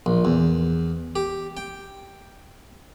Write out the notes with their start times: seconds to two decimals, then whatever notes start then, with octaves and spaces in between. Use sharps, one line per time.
0.06 A#1
0.25 E2
1.16 G4
1.57 G5